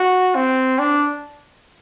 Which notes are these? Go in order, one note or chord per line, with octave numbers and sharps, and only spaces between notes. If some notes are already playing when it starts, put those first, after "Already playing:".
Already playing: F#4
C4
D4